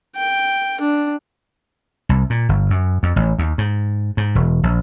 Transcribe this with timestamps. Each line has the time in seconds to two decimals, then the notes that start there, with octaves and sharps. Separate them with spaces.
0.16 G5
0.81 D4
2.09 C2
2.30 A#2
2.49 G1
2.70 F#2
3.03 F2
3.16 A1
3.39 D#2
3.58 G#2
4.17 G#2
4.35 E1
4.63 A#1